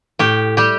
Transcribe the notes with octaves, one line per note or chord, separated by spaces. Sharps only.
A2 G4
G3 G4